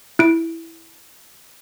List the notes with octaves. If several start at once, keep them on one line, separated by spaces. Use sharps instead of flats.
E4 D7